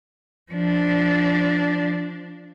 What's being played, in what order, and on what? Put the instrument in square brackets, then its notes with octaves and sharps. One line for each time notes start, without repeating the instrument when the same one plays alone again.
[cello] F3 D4